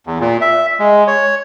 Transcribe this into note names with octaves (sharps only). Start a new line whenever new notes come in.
E2
A#2
E5
G#3
C#5